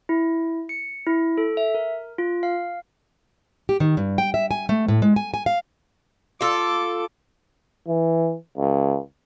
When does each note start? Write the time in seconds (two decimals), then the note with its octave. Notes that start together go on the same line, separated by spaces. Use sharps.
0.09 E4
0.69 C#7
1.06 E4
1.38 A4
1.57 E5
1.74 A#4
2.18 F4
2.43 F5
3.69 G4
3.80 D#3
3.97 G2
4.18 G5
4.34 E5
4.51 G#5
4.69 A3
4.88 A2
5.02 G#3
5.16 G#5
5.34 G#5
5.46 F5
6.41 F4 A4 D6
7.88 E3
8.58 C#2